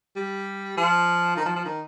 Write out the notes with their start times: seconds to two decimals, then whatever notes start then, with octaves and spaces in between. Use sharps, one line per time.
0.16 G3
0.77 F3
1.37 D#3
1.46 F3
1.56 F3
1.65 D#3